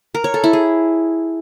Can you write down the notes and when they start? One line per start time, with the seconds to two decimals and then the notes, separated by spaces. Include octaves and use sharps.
0.15 A#4
0.24 C#5
0.34 A4
0.44 E4
0.53 G#4